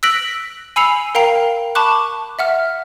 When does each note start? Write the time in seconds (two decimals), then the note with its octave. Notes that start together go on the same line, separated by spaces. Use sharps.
0.03 E6 F#6 A#6 B6 D7 F#7
0.76 G#5 B5 E6 C7 C#7 F7
1.15 A#4 F5 G5 A#5 C7
1.75 A5 B5 C#6 D6 F#6
2.39 E5 F#5 F6